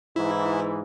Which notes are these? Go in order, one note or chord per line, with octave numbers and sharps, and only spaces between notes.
G#2 E3 E4